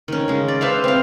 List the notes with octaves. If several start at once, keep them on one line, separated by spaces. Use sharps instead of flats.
D#3 C#4
C#3 G#3
D5
B4 C5 E5 F5
C4 F5